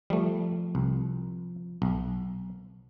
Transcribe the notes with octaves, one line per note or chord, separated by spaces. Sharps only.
F3 G3 A3
C2
B1